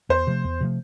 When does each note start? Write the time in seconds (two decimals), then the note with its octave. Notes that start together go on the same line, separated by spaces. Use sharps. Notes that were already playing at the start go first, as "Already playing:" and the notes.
0.09 E2 C5
0.27 C3 F3 A3
0.44 E2
0.61 C3 F3 A3